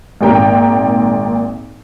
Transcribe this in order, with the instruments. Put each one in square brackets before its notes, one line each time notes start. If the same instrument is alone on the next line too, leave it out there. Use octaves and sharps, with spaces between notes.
[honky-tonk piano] G#1 A#2 G5 A#5